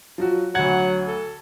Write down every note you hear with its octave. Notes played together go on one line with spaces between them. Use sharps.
F3 F#3 F#4
D2 F#3 F#5 G#6
A4